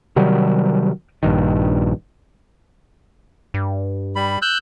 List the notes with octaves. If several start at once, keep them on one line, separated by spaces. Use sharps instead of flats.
C3 D#3 F#3 G3
A#1 G2 D#3
G2
G3 B5
E6 F#6 G6